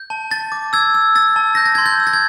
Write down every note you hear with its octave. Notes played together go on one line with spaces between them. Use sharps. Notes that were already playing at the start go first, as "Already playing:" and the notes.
Already playing: G6
A5
A5 A6
D6
E6 G#6
E6
E6 A6
A5
G6 A#6
A6
C6 G#6
G6
E6
A6
G#6